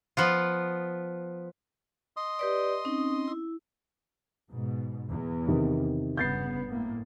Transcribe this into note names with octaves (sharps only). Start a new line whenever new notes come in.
F3 B3 F4
D#5 C6 D#6
G4 B4 D5
C4 C#4 D#4
E4
G#2 B2
E2
C3 D#3
G1 C#3 B3 G6 A6 C7
A2 A#3